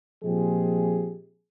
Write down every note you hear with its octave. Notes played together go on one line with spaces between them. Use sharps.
A#2 F3 G#3 C4 G4 G#4